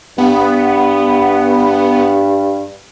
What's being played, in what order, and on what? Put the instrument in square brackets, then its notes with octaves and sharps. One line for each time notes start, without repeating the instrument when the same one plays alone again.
[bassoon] G2 [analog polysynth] B3